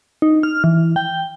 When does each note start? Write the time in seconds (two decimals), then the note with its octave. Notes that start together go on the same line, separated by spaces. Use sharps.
0.22 D#4
0.43 F6
0.64 E3
0.96 G5